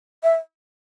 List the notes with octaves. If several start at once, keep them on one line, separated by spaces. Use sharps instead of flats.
E5